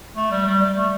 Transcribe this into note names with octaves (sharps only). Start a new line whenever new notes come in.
A3
G3
G3
G3
A3